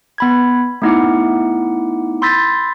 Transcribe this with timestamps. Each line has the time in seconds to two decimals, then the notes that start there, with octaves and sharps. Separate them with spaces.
0.18 B3 B5 G#6
0.82 A3 B3 D#4 E4 F#5 D6
2.22 B5 C6 E6 G6 A6 B6